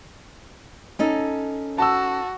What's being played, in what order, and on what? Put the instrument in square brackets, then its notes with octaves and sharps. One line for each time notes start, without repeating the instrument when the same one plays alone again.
[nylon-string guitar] C#4 D#4 A4
[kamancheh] F#4 [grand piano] A5 E6